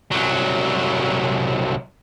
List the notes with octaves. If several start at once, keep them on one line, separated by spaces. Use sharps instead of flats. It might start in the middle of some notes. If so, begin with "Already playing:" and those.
C2 F#3